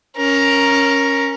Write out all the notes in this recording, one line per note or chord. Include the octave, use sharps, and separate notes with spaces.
C#4 A#4